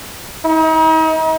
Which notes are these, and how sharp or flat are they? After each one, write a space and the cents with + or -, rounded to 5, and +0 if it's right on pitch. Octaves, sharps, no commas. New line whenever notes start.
D#4 +40